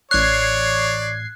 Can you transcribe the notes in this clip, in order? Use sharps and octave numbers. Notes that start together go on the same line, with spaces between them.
A1 C#5 D5 F#6 G#6 C7